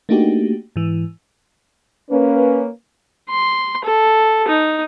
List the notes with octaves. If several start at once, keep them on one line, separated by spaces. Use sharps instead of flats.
A3 A#3 D4 D#4 F#4 G4
G#2 E3
A#3 C#4 B4
C6
A4
D#4